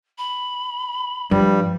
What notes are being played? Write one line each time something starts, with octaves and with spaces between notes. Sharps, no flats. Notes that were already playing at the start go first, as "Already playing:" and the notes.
B5
G2 F3 G3